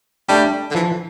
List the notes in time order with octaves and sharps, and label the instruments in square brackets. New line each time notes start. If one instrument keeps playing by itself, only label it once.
[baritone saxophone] G3 [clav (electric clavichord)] A3 D4 G4
[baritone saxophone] D3
[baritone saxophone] E3 [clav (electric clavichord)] F3